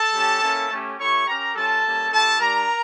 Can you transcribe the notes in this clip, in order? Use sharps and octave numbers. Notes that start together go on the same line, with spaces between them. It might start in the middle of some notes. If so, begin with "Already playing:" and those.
Already playing: A4 A5
G3 C#4 G4
A#3 C#4 E4
A3 C#4 G4
A3 E4 G4 C#5 C#6
C#4 G4 A#4 A#5
G3 C#4 F4 A4 A5
G3 A#3 C#4
A3 E4 G4 A4 A5
G3 D4 G4 A#4 A#5